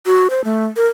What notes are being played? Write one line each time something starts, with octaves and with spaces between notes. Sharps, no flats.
F#4
C5
A3
A#4